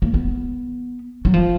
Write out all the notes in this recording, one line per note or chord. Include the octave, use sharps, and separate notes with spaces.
A#3
B3
F#3
F3